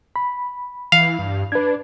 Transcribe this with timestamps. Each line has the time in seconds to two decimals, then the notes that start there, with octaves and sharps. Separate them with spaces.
0.16 B5
0.92 E3 F5
1.19 G2
1.52 D4 B4 G#6